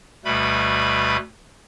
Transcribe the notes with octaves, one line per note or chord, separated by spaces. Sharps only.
D2 B2 G3 A3 B4 B5